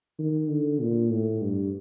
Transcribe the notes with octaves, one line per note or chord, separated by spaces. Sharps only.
D#3
D3
A#2
A2
G2